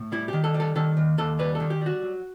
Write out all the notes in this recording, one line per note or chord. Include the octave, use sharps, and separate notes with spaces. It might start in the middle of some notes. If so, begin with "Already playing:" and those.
Already playing: A2
G3 E4
D#3 G4
A4
G3
A4
D#3 A4
D#2
D#2 A4
G3 B4
A4
D#3
G4
G3
F#4
F#3